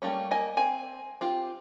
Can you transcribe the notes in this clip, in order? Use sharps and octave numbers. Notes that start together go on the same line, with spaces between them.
G3 A3 A#3 C#4
A#3 D#5 G#5
C4 G#5
C4 F4 G4